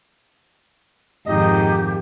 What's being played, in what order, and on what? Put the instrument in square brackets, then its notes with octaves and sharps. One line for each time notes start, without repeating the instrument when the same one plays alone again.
[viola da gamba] F2 G#2 D#3 [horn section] D#4 D#5 [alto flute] G4